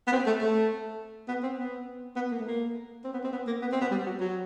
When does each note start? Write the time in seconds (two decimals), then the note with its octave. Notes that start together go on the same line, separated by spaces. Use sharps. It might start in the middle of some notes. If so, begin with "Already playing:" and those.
0.07 B3
0.12 C4
0.26 A3
0.41 A3
1.28 B3
1.43 C4
1.58 B3
2.16 B3
2.31 A#3
2.39 A3
2.47 A#3
3.04 C4
3.13 B3
3.24 C4
3.33 B3
3.47 A#3
3.62 B3
3.72 C4
3.81 B3
3.91 G3
4.06 F#3
4.20 F#3